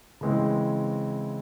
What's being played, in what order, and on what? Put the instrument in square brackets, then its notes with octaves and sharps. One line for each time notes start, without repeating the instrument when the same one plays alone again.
[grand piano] C#3 E3 G#3 C4